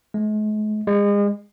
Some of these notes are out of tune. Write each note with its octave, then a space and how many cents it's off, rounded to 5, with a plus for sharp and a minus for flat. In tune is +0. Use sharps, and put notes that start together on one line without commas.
G#3 +45
G#3 -35